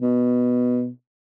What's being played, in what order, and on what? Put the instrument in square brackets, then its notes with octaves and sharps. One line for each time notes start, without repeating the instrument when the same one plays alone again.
[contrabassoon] B2